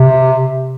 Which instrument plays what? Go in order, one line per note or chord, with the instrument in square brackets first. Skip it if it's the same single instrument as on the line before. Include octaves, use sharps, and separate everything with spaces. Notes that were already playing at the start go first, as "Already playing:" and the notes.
Already playing: [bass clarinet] C3